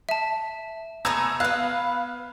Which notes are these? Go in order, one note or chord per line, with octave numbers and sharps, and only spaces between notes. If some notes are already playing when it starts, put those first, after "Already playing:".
E5 A5
A3 B3 G#4 A#5 E6 G#6
B3 B4 F5 F#6